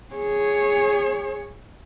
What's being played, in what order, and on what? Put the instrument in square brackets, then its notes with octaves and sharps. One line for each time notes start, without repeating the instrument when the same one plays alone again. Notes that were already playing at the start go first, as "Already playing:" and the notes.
[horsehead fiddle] G#4 C#5